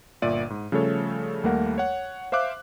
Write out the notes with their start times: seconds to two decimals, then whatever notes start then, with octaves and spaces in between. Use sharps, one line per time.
0.22 G1 A#2 D5 E5 D#7
0.50 G#2
0.72 C#3 F3 G3 A3 A4 C#5
1.43 D#2 G3 A3 A#3 A#4 F#5
1.78 C#5 F#5
2.32 C5 E5 F5 D6 F#6